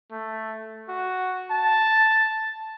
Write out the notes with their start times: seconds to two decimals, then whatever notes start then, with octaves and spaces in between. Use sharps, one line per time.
0.11 A3
0.88 F#4
1.50 A5